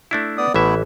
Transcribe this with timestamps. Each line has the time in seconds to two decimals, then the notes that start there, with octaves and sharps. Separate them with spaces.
0.11 A3 D4 E4
0.37 B3 D5 D#6
0.54 A1 E3 A3 B3 E4 E5